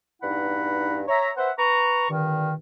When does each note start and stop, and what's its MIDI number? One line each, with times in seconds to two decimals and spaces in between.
0.22 1.02 40
0.22 1.02 43
0.22 1.02 63
0.22 1.02 64
0.22 1.02 78
0.22 1.02 83
1.08 1.31 73
1.08 1.31 76
1.08 1.31 82
1.37 1.50 71
1.37 1.50 72
1.37 1.50 76
1.37 1.50 78
1.59 2.07 71
1.59 2.07 82
1.59 2.07 85
2.10 2.54 43
2.10 2.54 46
2.10 2.54 50
2.10 2.54 51